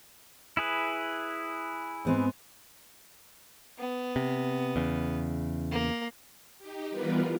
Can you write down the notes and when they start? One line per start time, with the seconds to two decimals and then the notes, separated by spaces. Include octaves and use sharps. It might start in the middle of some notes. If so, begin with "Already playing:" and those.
0.57 E4 G#4 B4
2.05 G#2 B3 C4
3.78 B3
4.16 C3
4.76 E2 C#3
5.71 A#3
6.58 D#4 G4
6.90 E3 G3 B3 F4 A#4 B4